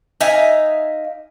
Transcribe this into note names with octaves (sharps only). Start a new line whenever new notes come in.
D#4 E5 F5 G#5